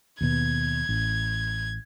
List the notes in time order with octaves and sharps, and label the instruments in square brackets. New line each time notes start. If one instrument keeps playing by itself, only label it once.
[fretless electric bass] D#2 B2 [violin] G#6
[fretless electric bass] A1